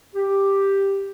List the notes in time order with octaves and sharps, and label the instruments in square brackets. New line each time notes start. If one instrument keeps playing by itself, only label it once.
[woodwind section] G4